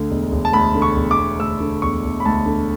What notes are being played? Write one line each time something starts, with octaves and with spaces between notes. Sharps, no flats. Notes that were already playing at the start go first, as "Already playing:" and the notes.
Already playing: D2 D3
E1
E1
A5
D2 B5
D3
C#6
E1
D6
E1
D2 E6
D3
E1 C#6
E1
B5
D2 A5
D3